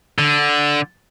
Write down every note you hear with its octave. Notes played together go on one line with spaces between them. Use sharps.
D3